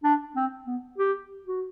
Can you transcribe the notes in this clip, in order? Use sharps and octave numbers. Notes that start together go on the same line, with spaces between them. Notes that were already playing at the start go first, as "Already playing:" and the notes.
D4
C4
B3
G4
F#4